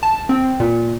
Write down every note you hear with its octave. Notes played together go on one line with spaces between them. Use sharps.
A5
C4
A#2